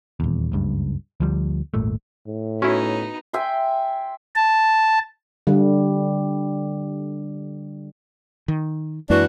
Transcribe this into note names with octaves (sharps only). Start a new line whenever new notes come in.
D#1 E2
F#1 C#2 G2
D2 F3 G3
D#1 G#1 A#2 A3
A2
B3 C#4 D#4 E4 F#4
E5 G5 G#5 C6
A5
D3 G3
D#3
F#2 E3 G#3 A#3 D4 F#4